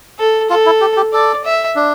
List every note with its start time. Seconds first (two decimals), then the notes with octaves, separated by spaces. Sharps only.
0.19 A4
0.50 F4 A4
0.66 E4
0.81 G4
0.97 G4
1.13 A4 D5
1.45 E5
1.76 D4